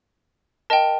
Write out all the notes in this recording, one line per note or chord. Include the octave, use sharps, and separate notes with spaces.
A#4 D#5 G5 A5